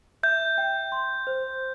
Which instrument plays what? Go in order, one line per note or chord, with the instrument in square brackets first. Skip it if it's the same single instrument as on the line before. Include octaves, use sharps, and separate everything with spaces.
[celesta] E5 [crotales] G6
[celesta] G5
C6
C5